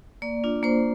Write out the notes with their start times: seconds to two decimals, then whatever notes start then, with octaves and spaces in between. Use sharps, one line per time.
0.22 A#3 D5
0.44 D4 F4
0.63 A#3 C5